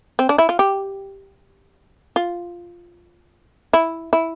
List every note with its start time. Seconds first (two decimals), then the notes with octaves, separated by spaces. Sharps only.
0.19 C4
0.29 D4
0.38 E4
0.49 F4
0.59 G4
2.16 F4
3.73 E4
4.13 E4